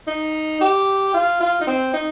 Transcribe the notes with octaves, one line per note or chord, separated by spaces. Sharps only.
D#4
G4
F4
F4
D#4
C4
D#4